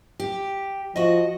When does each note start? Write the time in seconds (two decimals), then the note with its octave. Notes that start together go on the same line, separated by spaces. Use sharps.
0.20 G4
0.96 F3 F#4 D#5